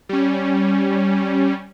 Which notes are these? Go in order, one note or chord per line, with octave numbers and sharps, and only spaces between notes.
G3 C#4